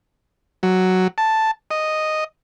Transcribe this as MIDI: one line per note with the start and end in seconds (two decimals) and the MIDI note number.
0.63 1.08 54
1.18 1.51 81
1.71 2.24 75